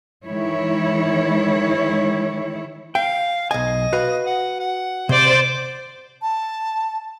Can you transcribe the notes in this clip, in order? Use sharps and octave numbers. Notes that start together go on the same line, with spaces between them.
D#3 E3 G#3 E4 C#5
F5 G5
B1 D#5 G#5
F#4 B4 F5
F#5
F#5
C3 C5 D5
A5